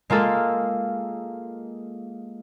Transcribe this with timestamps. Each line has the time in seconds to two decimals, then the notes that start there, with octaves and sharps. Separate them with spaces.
0.10 G#3 A#3 F4 A4